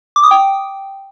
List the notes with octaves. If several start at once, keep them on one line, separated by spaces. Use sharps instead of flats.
D6
D#6
G5